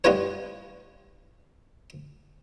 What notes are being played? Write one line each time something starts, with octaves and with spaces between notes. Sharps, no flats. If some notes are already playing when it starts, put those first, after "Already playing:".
G3 B3 D#4 F4 B4 C#5